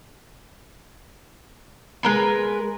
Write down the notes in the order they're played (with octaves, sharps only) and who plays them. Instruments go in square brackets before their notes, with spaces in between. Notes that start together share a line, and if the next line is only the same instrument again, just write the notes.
[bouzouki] G#3 A#4 B4